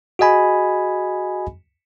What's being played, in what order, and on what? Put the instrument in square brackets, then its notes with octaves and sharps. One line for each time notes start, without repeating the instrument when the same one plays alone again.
[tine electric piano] F#4 G#4 D#5 G#5 B5